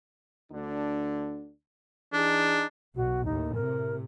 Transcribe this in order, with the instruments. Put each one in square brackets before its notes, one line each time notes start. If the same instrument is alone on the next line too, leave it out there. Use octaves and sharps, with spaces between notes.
[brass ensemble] D2 D3 D4
[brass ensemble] E3 D#4 G#4 [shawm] D4
[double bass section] B1 B2 [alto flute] F#4
[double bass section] D#2 A2 [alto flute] D#4
[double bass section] A2 C3 [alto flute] A#4